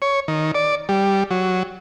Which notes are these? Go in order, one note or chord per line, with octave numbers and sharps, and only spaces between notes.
C#5
D#3
D5
G3
F#3